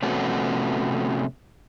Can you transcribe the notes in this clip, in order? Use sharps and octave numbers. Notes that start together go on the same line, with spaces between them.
C3 F3 A3 B3 C#4 F#4